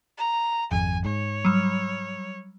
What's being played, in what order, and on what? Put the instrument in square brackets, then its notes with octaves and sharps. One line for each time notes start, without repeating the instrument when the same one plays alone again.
[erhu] A#5
[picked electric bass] G#1 F2 [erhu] G#5
[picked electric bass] G#2 [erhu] C#5
[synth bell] F#3 G3